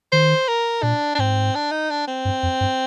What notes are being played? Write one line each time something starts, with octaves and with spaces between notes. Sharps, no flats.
D#3 C5
A#4
A#2 D4
D4
G#2 C4
D4
D#4
D4
C4
G2
F2
G2